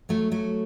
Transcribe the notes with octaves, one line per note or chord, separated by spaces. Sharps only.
F#3 A3
F#3 A3